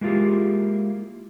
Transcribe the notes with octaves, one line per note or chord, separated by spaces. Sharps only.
G#3 A#3 E4 F4 G4 G#4